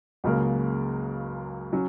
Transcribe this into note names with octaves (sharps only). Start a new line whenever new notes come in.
C#2 C#3 F#3 A#3
F#3 C#4